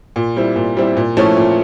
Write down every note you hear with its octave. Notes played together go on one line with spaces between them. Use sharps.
A#2
G3 C4 E4
A#2
G3 C4 E4
A#2
F3 A3 C#4 E4
A#2